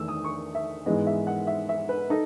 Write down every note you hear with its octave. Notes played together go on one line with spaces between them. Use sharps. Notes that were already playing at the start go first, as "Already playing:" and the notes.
Already playing: E2 D#3 A3 E6
D#6
C#6
E5
G#2 E3 G#3 B3 D#5
E5
F#5
E5
E5
B4
D#4 A4